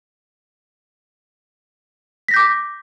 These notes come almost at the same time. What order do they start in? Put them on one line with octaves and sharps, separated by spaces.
B6 A#6 G6 D6